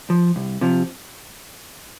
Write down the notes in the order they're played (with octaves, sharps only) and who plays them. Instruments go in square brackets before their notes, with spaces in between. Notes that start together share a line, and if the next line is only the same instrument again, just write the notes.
[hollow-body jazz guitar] F3
C2
C3 F3